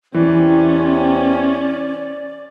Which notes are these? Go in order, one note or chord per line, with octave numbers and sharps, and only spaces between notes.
E2 C3 E3 C#4 D5